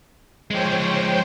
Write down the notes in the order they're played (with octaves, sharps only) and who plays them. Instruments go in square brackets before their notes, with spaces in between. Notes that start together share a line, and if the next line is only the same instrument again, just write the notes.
[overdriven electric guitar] F3 G#3 [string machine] C5 C#5 G5